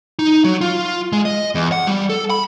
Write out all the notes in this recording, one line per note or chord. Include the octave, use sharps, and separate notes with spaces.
D#4
F#3
F4
G#3
D#5
E2
F#5
G3
A4
B5